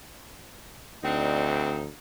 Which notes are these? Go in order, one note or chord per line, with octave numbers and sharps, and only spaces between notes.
D2 C4 D4 D#4